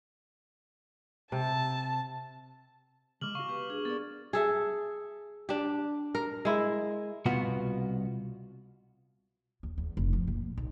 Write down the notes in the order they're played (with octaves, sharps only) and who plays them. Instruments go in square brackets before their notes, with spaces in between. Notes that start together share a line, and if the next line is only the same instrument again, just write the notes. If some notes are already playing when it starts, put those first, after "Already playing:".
[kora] C3 [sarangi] A5
[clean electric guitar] C#3 G#3 [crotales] D6 F6 F#7
[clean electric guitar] F#4 F5 [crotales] C#6
[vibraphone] B3 G4 B4
D4 G#4
[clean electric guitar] B3 [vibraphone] G#4 A#4 D5 [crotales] A6
[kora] G#4 A4 E5
D4 G4
A#4
G#3 E4
[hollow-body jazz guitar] C2 B2 B3 F4 F#4 F#5
[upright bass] D#2
E2
F1
F3
A#2
B1